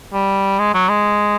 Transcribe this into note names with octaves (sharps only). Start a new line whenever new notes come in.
G3
G#3
F#3
G#3